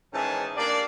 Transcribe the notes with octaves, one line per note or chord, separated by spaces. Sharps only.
G#2 D#3 E3 C#4 G#4 A5
A#3 D4 G4 D5